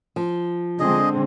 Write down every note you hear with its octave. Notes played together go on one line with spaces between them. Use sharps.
F3
D3 G#3 C4 G#4 D#5